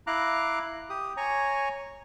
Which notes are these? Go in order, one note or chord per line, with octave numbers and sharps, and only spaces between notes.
E4 F5 A#5 D6 F#6
G4 D#6
C#5 G#5 A#5 C#6